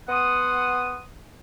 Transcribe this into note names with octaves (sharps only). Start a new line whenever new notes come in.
B3 F#5 C6 D#6